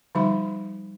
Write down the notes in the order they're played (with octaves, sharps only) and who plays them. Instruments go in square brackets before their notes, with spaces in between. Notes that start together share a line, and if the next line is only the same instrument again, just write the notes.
[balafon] D3 F3 G3 D#4 E5 B5